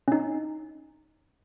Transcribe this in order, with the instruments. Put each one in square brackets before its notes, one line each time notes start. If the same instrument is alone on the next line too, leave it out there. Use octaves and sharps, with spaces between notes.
[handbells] C#4 D#4